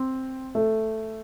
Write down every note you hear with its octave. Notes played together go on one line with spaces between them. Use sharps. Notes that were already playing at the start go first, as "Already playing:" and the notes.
Already playing: C4
A3